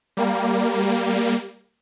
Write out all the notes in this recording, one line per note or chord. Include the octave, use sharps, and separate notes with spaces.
G3 A#3